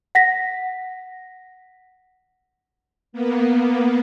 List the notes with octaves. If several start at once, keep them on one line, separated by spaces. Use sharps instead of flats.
F#5 A#6 B6
A#3 B3